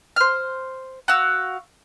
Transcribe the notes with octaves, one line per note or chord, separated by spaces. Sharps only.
C5 F6
F#4 F5 E6